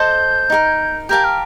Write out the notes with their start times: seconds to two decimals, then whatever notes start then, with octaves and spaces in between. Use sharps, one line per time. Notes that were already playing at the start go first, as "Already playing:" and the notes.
Already playing: A4 C5 D#5 A5 G6
0.50 D#4 G4 A#4
1.09 G4 A#4 F5 A5 G6
1.24 F6